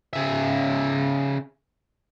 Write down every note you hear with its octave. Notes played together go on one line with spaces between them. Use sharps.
C#3 E5